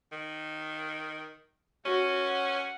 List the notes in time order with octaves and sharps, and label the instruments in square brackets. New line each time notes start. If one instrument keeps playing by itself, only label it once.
[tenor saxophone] D#3
[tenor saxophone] C#4 [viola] F#4
[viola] F#5